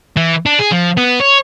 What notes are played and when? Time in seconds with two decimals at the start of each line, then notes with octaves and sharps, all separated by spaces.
0.17 E3
0.46 D4
0.59 G#4
0.72 F3
0.97 B3
1.20 C#5